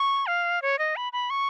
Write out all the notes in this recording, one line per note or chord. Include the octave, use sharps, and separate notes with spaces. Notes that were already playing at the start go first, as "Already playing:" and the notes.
Already playing: C#6
F5
C#5
D#5
B5
B5
C#6